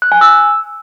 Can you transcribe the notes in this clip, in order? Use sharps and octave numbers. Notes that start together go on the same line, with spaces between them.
F#6
G#5
E6